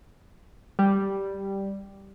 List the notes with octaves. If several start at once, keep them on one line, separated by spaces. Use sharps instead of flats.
G3